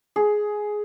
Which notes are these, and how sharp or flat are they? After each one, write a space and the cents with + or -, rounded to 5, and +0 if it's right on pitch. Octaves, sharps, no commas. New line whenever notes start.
G#4 +10